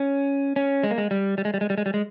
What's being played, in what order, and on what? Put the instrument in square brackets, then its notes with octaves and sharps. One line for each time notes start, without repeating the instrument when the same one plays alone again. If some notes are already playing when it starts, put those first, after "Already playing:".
Already playing: [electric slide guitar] C#4
C#4
G#3
A#3
G#3
G3
G3
G#3
G3
G#3
G3
G#3
G3
G#3